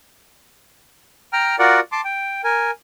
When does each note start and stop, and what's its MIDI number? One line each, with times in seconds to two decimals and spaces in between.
1.33 1.56 79
1.33 1.56 82
1.33 1.56 89
1.59 1.80 65
1.59 1.80 66
1.59 1.80 70
1.59 1.80 74
1.59 1.80 78
1.92 2.01 81
1.92 2.01 84
1.92 2.01 86
2.04 2.41 79
2.44 2.71 70
2.44 2.71 80